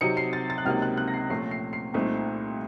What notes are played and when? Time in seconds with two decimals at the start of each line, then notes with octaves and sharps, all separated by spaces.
0.01 C3 F#3 C4 D#4 C#7
0.17 C7
0.33 A6
0.50 A6
0.58 F#6
0.65 C#2 C3 F#3 A#3 D#4 F6
0.82 F#6
0.97 F#6
1.08 A#6
1.14 C7
1.30 A#2 F3 A3 C#4 C7
1.51 C7
1.73 C7
1.94 C2 A#2 A3 C4 D#4